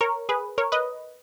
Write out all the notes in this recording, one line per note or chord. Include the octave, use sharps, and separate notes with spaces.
A#4 C#5
G#4 B4
A#4 C#5
B4 D#5